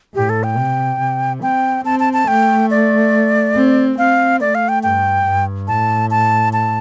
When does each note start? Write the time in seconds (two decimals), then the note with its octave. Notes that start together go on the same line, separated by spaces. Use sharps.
0.15 A2 G4
0.29 A4
0.44 G5
0.57 C3
1.00 C3
1.42 C4 G5
1.85 C4 A5
2.00 A5
2.13 A5
2.28 A3 G5
2.71 D5
3.55 C4
3.98 C4 F5
4.41 A3 D5
4.55 F5
4.69 G5
4.83 G2 G5
5.26 G2
5.68 A2 A5
6.11 A5
6.53 A5